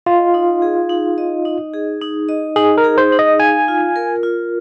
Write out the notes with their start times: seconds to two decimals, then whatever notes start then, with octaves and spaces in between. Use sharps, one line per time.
0.06 F4 D#5
0.34 D#4
0.62 G#4
0.89 D#4
1.18 D#5
1.45 D#4
1.73 G#4
2.01 D#4
2.29 D#5
2.56 D#4 G#4
2.78 A#4
2.84 G#4
2.98 C5
3.12 D#4
3.19 D#5
3.39 F5 G#5
3.68 F4
3.96 A#4
4.23 F4